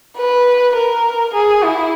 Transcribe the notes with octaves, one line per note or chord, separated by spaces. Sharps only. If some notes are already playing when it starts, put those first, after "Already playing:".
B4
A#4
G#4
E4